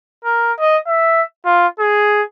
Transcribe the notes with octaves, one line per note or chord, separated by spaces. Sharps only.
A#4
D#5
E5
F4
G#4